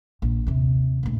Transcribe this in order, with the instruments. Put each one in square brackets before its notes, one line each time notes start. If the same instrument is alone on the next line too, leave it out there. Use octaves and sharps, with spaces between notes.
[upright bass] A#1
D#2 C3
A#1 A2